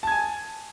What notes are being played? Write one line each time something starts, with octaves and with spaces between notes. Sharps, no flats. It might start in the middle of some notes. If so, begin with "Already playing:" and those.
G#5 A5 G#6